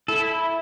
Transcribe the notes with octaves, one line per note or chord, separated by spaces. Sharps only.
E4 A4